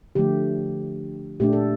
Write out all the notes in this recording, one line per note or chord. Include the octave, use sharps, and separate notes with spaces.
D3 F3 A3 G4
A#2 A3 D4 G4
A4